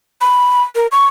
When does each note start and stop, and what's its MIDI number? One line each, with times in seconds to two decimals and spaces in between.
0.21 0.62 83
0.75 0.87 70
0.92 1.07 85